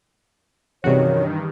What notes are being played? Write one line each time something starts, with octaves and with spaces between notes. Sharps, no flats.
G2 C3 D#3 E3 C#4 F#4 G#4 C#5